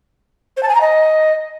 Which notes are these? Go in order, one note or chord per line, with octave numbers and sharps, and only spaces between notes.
C5
A5
G#5
A#5
D#5